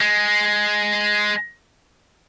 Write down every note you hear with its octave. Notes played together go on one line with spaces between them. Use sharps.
G#3